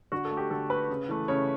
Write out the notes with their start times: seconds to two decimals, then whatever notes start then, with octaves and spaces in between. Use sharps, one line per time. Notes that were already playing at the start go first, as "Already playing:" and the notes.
0.12 D3 F#4
0.25 A4
0.31 A3
0.37 G4
0.50 D3 A4
0.70 A3 B4
0.90 C#3
1.09 E3 A3
1.28 C#3 C#5